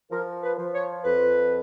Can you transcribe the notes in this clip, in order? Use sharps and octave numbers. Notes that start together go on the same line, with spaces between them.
F3 A#4
B4
F3
C#5
F2 B4